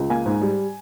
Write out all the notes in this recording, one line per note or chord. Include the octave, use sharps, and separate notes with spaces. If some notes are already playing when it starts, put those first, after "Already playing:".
Already playing: C#2
A#3 G#5
G#2
G3